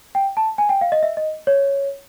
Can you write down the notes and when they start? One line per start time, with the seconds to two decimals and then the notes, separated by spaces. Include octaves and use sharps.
0.15 G5
0.37 A5
0.58 G#5
0.69 G5
0.81 F5
0.92 D#5
1.03 E5
1.17 D#5
1.47 C#5